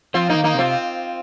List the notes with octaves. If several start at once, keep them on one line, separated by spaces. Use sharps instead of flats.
F3 C4 F4
A#3 D#4
D#3
A#3 D#4
C3
C4 F4